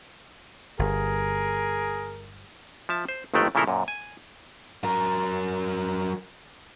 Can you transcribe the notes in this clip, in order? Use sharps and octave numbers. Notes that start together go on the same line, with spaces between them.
G1 G#4 A#4
F3 E5 A5
C5
G1 F2 D#3 G#3 A3 G5
A#2 C#3 F3 E4 A4 A#4
F#2 A#2
G#5
F#3 A#4